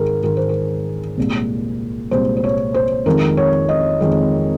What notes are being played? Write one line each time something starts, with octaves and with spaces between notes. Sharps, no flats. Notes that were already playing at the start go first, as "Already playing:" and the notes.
Already playing: G#2 D#3 G#4 A#4
G#2 D#3 G#3 A#4
C5
A#4
C2 A#2 G#3
C2 A#2 G#3 C5
C5
C#5
C5
F2 D#3 G#3 A#4
C#5
D#5
F2 D#3 G#3